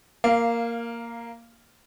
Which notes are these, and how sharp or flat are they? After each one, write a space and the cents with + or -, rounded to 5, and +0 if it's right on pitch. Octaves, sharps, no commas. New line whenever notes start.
A#3 +0 F5 -15